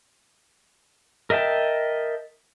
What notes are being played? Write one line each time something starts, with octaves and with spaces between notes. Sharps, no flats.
A#4 D#5 E5 G5 A5